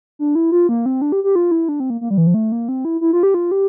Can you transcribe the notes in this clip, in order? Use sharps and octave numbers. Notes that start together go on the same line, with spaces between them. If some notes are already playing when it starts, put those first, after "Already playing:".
D4
E4
F4
A#3
C4
D4
G4
G4
F4
E4
D4
C4
A#3
A#3
G3
E3
F3
A3
A#3
C4
E4
E4
F4
G4
F4
G4